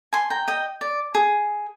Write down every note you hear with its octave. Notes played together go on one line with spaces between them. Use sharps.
G#5 C6
G5 A#5
D#5 G5
D5
G#4